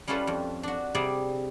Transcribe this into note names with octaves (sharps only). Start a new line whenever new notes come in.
G3 C#4 E4 F4 A4 B4
F2
D4 F#4
C3 G3 G#4 D5